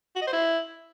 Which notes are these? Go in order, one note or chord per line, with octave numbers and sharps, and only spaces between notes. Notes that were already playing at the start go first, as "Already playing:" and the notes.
F#4
D#5
C5
E4